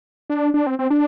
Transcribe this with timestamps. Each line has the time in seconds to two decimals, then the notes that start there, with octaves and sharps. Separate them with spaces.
0.30 D4
0.54 D4
0.67 C4
0.79 C4
0.90 D4